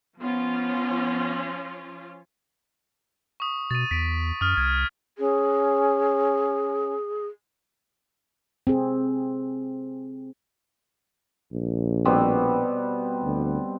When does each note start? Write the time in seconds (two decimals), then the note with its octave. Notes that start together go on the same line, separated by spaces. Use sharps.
0.20 F3 B3 C#4 F4
3.40 C#6 D#6
3.71 B2 A6 D#7
3.91 E2 B6 D7
4.41 F#2 D#6 F6
4.57 C2 G#6
5.18 C#4 G#4
8.67 C4 G#4
11.52 A#1
12.05 B2 G3 C4
13.23 D2